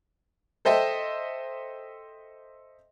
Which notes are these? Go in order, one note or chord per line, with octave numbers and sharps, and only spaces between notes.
A4 C5 D#5 E5 G5